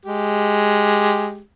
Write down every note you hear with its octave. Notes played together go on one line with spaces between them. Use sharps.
G#3 G4